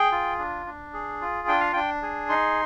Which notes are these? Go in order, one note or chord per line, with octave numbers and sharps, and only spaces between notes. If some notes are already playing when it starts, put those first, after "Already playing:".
Already playing: G#4 G5
F4
D4
D4
G#4
F4
D4 G5
F5
D4 G5
G#4
D#4 C6